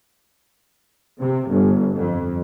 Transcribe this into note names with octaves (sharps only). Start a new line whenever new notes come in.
C3
G1
F2